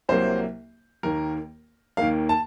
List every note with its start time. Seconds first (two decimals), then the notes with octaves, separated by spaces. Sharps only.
0.09 C2 C3 F#3 A#3 C5
1.03 D#2 D#3 A#3 A#4
1.97 D#2 D#3 A#3 F5
2.29 A5